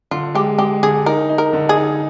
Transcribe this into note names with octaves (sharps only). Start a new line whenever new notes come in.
D3 F4
G#3 G4
G#3 G4
D3 G#4
D#4 A#4
D#4
A#4
D3
G#4
D#4